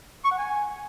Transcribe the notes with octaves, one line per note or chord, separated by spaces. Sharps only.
C#6
F#5
G#5